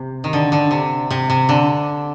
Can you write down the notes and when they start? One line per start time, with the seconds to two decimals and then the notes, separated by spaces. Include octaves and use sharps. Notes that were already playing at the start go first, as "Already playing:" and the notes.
Already playing: C3
0.24 D#3
0.33 D3
0.52 D3
0.71 C3
1.10 C3
1.30 C3
1.49 D3